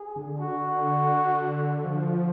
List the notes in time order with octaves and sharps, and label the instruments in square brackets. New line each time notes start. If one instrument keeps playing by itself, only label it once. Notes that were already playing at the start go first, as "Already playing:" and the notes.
Already playing: [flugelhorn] G#4
[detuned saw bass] D3
[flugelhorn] F#4
[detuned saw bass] F3